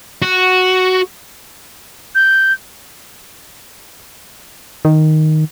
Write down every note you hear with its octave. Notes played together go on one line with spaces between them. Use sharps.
F#4
G6
D#3